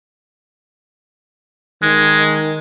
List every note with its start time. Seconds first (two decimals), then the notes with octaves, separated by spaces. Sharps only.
1.82 D#3 G#3